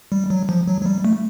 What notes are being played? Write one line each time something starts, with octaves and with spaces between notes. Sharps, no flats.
G3
F#3
F3
F#3
F#3
G3
A3